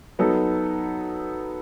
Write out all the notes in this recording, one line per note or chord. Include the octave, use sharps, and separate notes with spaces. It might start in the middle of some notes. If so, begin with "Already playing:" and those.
F#3 B3 D#4 A4